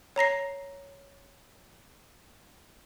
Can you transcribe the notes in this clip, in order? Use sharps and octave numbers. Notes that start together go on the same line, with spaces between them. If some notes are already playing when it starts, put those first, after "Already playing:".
C#5 A#5 A#6 C7